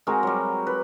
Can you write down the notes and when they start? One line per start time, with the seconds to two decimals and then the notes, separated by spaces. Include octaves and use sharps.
0.07 G#3 C4 F#4 A#4
0.23 F#3 G3
0.67 B4